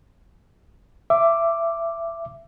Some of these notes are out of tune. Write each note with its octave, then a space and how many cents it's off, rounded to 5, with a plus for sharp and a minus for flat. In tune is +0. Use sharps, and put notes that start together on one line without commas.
E5 +20 D6 +0